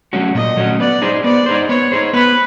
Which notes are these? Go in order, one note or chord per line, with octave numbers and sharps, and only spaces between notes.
F#3 A3 C#4 F#4
A#2 D#5
F#3 A3 C#4 F#4
B3 D5
D#4 G#4 C5
B3 D5
D#4 G#4 C5
B3 C#5
D#4 G#4 C5
B3 B4